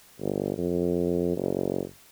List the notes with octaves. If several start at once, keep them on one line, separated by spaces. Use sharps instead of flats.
G1
F2
F#1